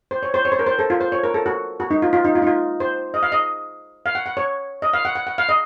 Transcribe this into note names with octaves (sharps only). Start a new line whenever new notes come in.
C5
C#5
C5
C#5
C5
A#4
C5
A4
F4
C5
C#5
A#4
A4
F#4
F#4
D#4
F4
F4
D#4
F4
D#4
F4
C5
D#5
F5
D#5
F5
F#5
F#5
C#5
D#5
F5
F#5
F#5
F#5
F5
D#5